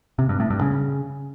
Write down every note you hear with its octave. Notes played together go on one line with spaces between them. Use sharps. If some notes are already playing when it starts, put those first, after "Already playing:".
C3
G2
A2
G2
C#3